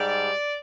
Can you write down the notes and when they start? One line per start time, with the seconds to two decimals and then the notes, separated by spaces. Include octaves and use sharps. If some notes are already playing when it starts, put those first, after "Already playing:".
Already playing: G#2 G3 D5